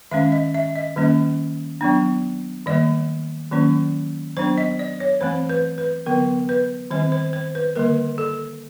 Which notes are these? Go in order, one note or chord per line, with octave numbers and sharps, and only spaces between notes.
D#3 G#3 C#4 E5
D#5
E5
D#5
D#3 G3 A#3 C#4
F#3 B3 D4
D#3 G3 A#3 D5
D#3 F#3 A#3 C#4
F#3 B3 D4 C5
D#5
D5
C#5
E3 A3 C4 C5
B4
B4
D3 F#3 B3 A#4
B4
D#3 G3 C4 C5
C5
C5
B4
D3 G3 A#3 A#4
A4